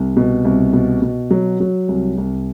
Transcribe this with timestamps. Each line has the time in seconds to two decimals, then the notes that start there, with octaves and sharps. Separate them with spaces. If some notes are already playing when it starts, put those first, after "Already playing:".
Already playing: C2
0.17 B2
0.45 C2
0.73 B2
1.02 B2
1.31 F#3
1.60 F#3
1.88 C2
2.18 C2